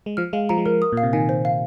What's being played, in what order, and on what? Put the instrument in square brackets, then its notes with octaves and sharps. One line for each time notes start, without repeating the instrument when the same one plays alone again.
[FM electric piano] G#3
[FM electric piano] F3 [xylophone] F6
[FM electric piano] G#3 [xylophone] F5
[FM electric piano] F3 [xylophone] A#5
[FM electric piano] G#3
[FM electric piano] F3 [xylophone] A#4
[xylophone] D#6
[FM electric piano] A#2 [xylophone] F5
[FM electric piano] C3
[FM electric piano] D#3 [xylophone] G#5
[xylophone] C5
F5